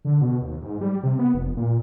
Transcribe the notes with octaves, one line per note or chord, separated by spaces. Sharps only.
D3
B2
D#2
G#2
G3
C3
B3
F1
A#2